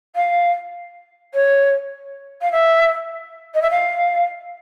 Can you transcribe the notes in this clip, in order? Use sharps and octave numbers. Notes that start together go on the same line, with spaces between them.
F5
C#5
F5
E5
D#5
E5
F5